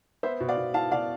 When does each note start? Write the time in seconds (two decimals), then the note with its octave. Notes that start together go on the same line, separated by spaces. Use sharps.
0.23 B3 C5 E5
0.40 B2
0.49 D5 F5
0.57 B2
0.74 E4 F5 A5
0.91 B2 D5 F5